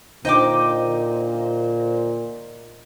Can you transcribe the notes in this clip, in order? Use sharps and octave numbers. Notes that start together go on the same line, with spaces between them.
A#2 D3 D#4 C5 D#5 G5 D6